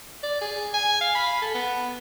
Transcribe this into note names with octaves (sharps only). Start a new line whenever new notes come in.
D5
G#4
G#5
F5
B5
A4
B3